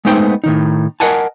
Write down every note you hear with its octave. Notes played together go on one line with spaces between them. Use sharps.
G#3 A3 B3 D#4 C5 G5
A2 D#3 D#4
A#4 B4 D#5 F#5 G#5 A5